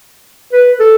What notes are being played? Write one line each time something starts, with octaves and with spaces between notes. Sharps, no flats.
B4
A4